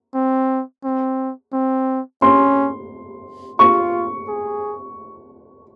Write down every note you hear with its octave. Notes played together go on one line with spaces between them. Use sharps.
C4
C4
C4
C#4 C6
F4 C#6
G#4